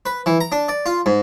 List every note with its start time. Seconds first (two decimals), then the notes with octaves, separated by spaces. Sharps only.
0.06 B4
0.26 E3
0.40 A#5
0.52 D4
0.68 D5
0.86 F4
1.06 G#2